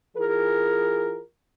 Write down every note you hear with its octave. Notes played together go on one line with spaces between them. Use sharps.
E3 F4 G#4 A#4